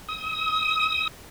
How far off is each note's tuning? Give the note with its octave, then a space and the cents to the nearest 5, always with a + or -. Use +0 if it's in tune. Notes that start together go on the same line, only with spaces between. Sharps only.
D#6 +35